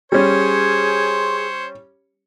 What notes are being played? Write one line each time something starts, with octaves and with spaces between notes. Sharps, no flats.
G3 C#4 G#4 C5 C#5